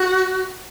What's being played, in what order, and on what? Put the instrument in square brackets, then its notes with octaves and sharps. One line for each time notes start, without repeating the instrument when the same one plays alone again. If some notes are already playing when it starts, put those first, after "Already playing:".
Already playing: [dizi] F#4